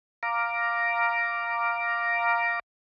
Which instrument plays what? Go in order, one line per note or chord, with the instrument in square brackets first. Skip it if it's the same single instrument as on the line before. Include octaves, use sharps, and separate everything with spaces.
[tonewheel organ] F5 A#5 D6